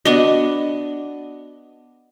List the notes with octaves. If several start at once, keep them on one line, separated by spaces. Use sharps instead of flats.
B3 D4 F#4 D#5